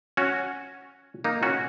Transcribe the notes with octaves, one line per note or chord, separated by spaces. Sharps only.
C#4 F#4
A#3 D#4
C#4 F#4